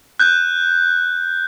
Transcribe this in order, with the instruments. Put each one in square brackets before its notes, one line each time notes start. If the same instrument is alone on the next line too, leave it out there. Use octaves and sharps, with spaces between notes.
[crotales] F#6 G6